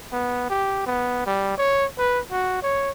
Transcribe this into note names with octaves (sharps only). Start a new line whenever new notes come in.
B3
G4
B3
G3
C#5
B4
F#4
C#5